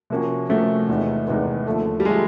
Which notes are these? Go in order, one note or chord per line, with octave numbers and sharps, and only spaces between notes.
C3 F3 A#3 C#4 F#4
C3 F3 A3 A#3 C#4 F#4
E2 C3 D#3 G#3 B3
E2 C3 D#3 G#3 B3
D#2 D3 F3 A3
G3
D3 F3 G#3 A3